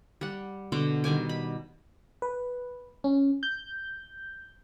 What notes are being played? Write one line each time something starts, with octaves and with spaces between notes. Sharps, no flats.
G3 F#5
B2 D3 F#4 D6
D#3 G3 G#5 D6
B5
B4
C#4
G6